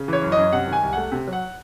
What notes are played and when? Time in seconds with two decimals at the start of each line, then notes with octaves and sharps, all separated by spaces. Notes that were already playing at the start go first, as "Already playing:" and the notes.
Already playing: C#3
0.08 E3 C#5
0.22 F#2
0.32 D#5
0.37 F#2
0.52 C3 F#5
0.67 D#3
0.73 G#5
0.83 C2
0.93 A3 F#5
1.12 C3
1.28 F#3
1.33 F#5